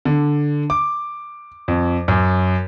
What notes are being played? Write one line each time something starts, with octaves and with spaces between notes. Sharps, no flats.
D3
D6
F2
F#2